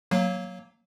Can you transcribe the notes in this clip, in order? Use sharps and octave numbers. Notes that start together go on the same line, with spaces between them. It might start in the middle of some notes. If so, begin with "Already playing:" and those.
F#3 A#3